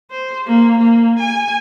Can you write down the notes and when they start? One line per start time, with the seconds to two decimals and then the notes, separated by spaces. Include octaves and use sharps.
0.11 C5
0.47 A#3
0.78 A#3
1.20 G#5